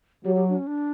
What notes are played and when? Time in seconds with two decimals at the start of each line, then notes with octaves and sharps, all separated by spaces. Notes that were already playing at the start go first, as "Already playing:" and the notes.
0.25 F#3 G4
0.35 G4
0.49 D4
0.57 C#4
0.67 D4